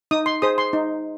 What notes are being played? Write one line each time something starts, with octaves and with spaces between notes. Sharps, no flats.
D#4 D#6
C6
G#4 C5 D#6
C6
D#4